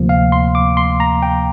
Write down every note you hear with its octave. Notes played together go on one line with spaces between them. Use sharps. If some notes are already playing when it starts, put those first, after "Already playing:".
Already playing: D2 C3 F3 A#3
F5
C6
D6
C6
A#5
G5